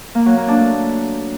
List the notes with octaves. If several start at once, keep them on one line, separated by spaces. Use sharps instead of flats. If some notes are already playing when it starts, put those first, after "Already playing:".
A#3
F#3
A#3
D4
A3